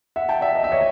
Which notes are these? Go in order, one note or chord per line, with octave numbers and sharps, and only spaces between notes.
E5 F#5
G5 A5
D5 E5
D#5
E5
C#5 D#5